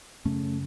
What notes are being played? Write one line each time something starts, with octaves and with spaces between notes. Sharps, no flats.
F#2 C#3 A3 C#4